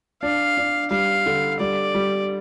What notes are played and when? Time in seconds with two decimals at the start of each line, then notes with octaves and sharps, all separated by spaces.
0.22 D4 F5
0.57 D4
0.91 G3 F5
1.26 D3
1.60 G3 D5
1.95 G3